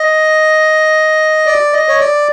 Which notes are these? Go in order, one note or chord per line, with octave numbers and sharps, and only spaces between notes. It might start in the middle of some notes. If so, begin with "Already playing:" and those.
Already playing: D#5
D5
D#5
C#5
D5